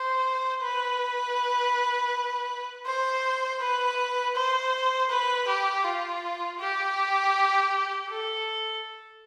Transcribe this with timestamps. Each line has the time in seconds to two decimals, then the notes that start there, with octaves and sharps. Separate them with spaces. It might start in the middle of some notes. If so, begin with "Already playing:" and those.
Already playing: C5
0.62 B4
2.86 C5
3.60 B4
4.35 C5
5.10 B4
5.47 G4
5.84 F4
6.60 G4
8.09 A4